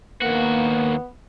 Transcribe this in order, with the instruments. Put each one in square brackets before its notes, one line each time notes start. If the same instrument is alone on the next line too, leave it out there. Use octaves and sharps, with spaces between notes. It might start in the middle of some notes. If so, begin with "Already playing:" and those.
[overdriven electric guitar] D#2 F#4 [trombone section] A#3 [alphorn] B3